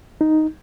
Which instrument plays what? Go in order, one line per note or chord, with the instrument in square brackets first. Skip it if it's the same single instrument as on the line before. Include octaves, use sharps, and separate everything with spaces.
[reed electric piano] D#4